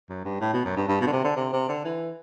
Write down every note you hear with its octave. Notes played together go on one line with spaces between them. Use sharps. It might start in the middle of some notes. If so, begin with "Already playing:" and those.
F#2
G2
A2
B2
F#2
G2
G2
B2
D3
C3
D3
C3
C3
D3
E3